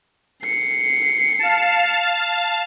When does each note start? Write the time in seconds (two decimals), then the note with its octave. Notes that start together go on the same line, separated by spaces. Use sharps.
0.44 C7 C#7
1.39 F5 A5